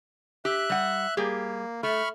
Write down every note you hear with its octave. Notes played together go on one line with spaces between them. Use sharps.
G4 E5 F#6
G3 F#5
G3 A#3 G4 G#4
A3 B5 C#6 F6